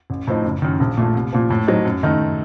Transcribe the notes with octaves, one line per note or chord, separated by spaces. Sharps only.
A1
A2 F3 C4 D#4
F#1
F#2 D#3
A#1
A#2 A3
C2
A#2 F3
A2
F#3 C4 D#4
F#2
D#3 A3 D#4